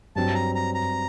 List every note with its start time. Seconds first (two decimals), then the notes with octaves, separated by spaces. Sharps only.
0.16 G2 F#3 C4 A5
0.35 A#5
0.55 A#5
0.74 A#5